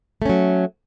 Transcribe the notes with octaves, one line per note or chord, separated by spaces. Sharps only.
F#3 A3 C#4